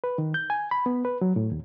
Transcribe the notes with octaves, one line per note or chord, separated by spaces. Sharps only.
B4
D#3
G6
G#5
B5
B3
B4
F#3
A2
D#2